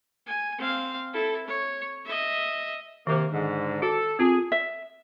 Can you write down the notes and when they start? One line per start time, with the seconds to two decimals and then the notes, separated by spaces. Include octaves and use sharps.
0.26 G#5
0.58 C4 F5
1.13 E4 A4
1.47 C#5
2.05 D#5 E5
3.07 C3 D#3 A#3
3.32 G#2 D3
3.82 F#4 A4
4.19 C4 F4 G#4 A5
4.52 E5